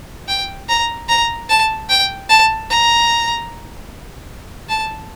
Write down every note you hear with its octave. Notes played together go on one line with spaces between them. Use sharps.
G5
A#5
A#5
A5
G5
A5
A#5
A5